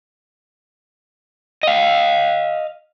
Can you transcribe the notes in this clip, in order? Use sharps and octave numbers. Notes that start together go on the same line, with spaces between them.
D#5 F5